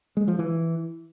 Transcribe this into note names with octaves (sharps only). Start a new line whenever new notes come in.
G#3
F3
E3